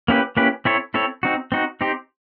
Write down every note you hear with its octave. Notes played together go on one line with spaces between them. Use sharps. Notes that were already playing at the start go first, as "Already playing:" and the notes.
A#3 C#4 E4 G4 B4
A#3 C#4 E4 G4 B4
C4 E4 A4 C#5
C4 E4 A4 C#5
C4 D#4 F#4
C4 D#4 F#4
C4 D#4 G4 C5